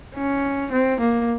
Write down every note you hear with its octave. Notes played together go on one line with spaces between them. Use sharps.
C#4
C4
A#3